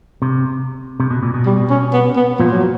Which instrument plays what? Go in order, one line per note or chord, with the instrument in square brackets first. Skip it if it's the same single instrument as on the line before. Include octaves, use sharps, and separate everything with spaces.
[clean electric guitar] C3
C3
B2
A#2
B2
[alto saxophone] G3
C#4
B3
B3
[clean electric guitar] A#2 [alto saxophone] F3
[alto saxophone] F#3